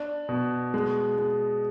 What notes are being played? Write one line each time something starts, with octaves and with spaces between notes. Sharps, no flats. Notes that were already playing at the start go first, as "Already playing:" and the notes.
Already playing: D4
B2
G#3
G#3